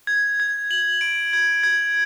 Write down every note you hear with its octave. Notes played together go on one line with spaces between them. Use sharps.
G#6
G#6
F#7
D7
G#6
G#6